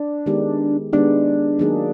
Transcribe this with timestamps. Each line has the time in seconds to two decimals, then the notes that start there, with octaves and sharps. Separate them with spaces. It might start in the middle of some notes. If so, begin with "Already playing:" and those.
Already playing: D4
0.26 D#3 G#3 B3 D#4 G4
0.93 D#3 G#3 B3 D4 D#4 G4
1.59 D#3 F#3 A#3 D#4 G#4